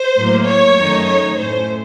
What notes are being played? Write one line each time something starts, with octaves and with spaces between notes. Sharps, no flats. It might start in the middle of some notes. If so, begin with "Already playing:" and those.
Already playing: C5
A2 F#3 A#3
C#5
F#2 D#3 A3 D#4
C#5
A2 A3 C#4 C5